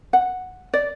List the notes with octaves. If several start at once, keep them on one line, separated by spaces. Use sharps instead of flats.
F#5
D5